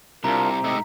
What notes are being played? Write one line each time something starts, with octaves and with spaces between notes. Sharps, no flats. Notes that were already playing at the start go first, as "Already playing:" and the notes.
C2 C3 D4 F4 A#4 A#5
G#2 A3 G4 D#5 E5